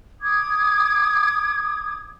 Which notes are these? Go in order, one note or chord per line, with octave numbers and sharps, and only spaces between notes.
D6 D#6 G#6